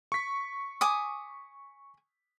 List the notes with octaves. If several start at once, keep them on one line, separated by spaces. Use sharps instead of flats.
C#6 B6
G#5 D6 D#6